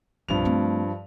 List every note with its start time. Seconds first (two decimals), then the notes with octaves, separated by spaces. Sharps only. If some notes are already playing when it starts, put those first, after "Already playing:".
0.28 C2 G2 B2 F3 F7
0.45 A3 C4